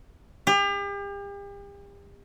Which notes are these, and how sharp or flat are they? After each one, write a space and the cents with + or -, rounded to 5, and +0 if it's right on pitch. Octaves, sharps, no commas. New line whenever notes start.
G4 +40